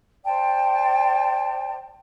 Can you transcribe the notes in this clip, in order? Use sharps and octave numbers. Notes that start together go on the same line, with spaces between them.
C5 D5 G5 A5